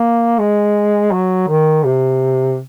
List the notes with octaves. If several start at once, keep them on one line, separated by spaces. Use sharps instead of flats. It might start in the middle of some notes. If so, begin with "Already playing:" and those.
Already playing: A#3
G#3
F#3
D#3
C3